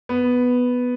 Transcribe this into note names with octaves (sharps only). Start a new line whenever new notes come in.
B3